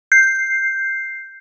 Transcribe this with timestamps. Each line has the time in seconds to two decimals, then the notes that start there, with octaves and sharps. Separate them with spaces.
0.12 G6 C7